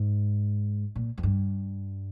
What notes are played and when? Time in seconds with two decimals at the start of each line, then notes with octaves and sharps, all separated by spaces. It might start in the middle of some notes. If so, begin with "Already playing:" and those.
Already playing: G#2
0.96 A#2
1.18 F2
1.23 G2